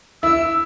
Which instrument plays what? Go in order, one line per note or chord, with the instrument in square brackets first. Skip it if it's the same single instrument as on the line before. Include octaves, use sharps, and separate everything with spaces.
[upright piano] E4 [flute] E6